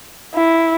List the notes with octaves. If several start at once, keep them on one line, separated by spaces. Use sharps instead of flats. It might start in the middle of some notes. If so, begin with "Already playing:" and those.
E4